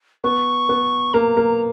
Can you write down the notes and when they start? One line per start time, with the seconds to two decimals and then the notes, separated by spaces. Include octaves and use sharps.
0.24 B3 C#6
0.69 B3
1.14 A#3 A#5
1.37 A#3